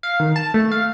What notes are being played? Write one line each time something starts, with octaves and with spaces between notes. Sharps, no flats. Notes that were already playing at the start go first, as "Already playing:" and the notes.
F5
D#3
A5
A3
F5